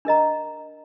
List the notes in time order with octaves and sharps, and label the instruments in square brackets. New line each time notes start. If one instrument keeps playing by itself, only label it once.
[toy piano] D4 A#4 D#5 A#5